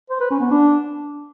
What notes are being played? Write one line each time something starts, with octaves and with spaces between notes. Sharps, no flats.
C5
B4
C#4
B3
D4